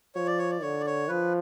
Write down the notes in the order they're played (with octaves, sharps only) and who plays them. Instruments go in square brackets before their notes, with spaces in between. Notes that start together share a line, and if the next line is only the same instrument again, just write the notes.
[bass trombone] F3 [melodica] C#5
[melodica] D5
C#5
D5
[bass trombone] D3 [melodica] C#5
[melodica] D5
C#5
[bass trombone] F3 [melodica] B4